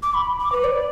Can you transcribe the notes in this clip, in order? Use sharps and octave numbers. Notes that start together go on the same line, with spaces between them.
D6
B5
D6
B4
D5